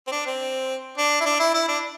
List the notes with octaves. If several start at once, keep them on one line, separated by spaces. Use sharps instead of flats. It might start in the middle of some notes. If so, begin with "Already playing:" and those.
C4
D4
C4
D4
E4
D4
E4
E4
D4